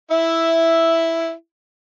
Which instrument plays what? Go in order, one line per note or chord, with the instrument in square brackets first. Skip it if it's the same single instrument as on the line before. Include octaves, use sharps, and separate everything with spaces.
[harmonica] E4 E5